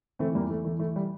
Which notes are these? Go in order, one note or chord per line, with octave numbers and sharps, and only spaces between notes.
E3 A3 C4
E2 G3 A#3
E2 A3
E3 A3
E3 A3
G3